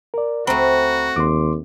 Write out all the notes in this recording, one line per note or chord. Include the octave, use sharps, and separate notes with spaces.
A#4 D5
C#2 A3 C4 F#4 A#5 B5
D#2 C6 D6